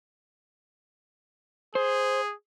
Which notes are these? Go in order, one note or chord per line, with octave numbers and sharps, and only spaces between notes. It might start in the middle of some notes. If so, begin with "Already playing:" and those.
G#4 C5